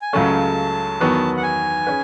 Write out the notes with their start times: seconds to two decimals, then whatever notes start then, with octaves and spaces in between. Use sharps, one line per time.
0.02 G#5
0.13 C#2 C#3 F#3 A3 C#4 A5
1.01 E2 D#3 F#3 B3 F#4
1.37 F#5
1.43 G#5
1.87 C#4 G#4 B4